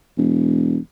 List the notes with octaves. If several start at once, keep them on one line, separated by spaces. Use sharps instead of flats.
E1